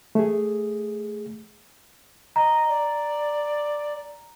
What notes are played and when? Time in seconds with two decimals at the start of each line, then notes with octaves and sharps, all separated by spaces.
0.15 A3 G#4
2.36 D#5 A#5
2.69 D5